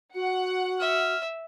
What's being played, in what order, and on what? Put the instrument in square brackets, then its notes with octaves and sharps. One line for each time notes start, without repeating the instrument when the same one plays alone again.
[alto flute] F#4 [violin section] F#5
[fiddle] E5 [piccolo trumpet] F6